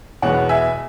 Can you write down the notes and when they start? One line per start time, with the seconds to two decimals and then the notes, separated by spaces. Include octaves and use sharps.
0.22 E2 B2 G#3 B3 C#5 F#5
0.49 E5 G#5